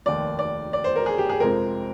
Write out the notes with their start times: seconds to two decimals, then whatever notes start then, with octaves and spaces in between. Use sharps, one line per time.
0.06 F1 D#2 D#3 D5
0.39 D5
0.73 D5
0.84 C5
0.96 A#4
1.06 G#4
1.18 G4
1.29 G#4
1.40 F2 C3 F3 G#3 C4 A#4